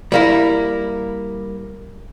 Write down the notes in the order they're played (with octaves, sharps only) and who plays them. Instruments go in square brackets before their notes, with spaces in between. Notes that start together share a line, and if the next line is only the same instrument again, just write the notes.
[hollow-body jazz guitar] G3 A#3 E4